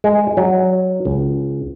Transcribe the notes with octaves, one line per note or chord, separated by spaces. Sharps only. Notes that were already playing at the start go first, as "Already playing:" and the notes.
G#3
F#3
C#2